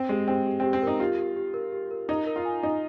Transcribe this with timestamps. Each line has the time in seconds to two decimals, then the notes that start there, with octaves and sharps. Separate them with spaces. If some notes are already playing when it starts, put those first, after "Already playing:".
Already playing: C4
0.09 G#3 G4
0.28 C4 G4
0.46 G4
0.60 C4 G4
0.73 C4
0.83 D#4 A#4
1.00 F4 G4
1.19 G4
1.37 G4
1.54 A#4
1.72 G4
1.91 A#4
2.09 D#4 D#5
2.27 A#4
2.36 F4
2.45 G#5
2.63 D#4 D#5